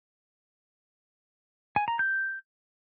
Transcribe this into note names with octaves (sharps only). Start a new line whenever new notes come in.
G#5
A#5
G6